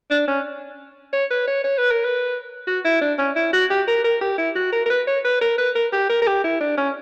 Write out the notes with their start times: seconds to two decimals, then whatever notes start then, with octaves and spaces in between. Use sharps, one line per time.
0.10 D4
0.28 C#4
1.13 C#5
1.31 B4
1.48 C#5
1.64 C#5
1.78 B4
1.91 A#4
2.04 B4
2.67 F#4
2.85 E4
3.01 D4
3.18 C#4
3.36 E4
3.53 F#4
3.70 G4
3.88 A#4
4.04 A#4
4.21 G4
4.38 E4
4.55 F#4
4.72 A#4
4.86 A#4
4.90 B4
5.07 C#5
5.25 B4
5.41 A#4
5.58 B4
5.75 A#4
5.93 G4
6.09 A#4
6.22 A#4
6.27 G4
6.44 E4
6.61 D4
6.77 C#4